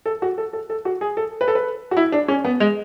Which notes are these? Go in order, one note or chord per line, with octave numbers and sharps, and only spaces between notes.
A4
F#4
A4
A4
A4
F#4
G#4
A4
B4
A4
B4
F#4
E4
D4
C#4
B3
G#3